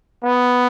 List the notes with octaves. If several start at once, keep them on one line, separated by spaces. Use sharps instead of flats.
B3